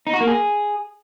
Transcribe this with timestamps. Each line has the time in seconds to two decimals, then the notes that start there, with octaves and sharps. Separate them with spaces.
0.07 D#4
0.14 F#4
0.20 A#3
0.27 G#4